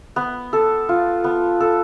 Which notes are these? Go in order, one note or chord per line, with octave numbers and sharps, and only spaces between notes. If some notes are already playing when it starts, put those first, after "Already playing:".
B3
A4
F4
B3
A4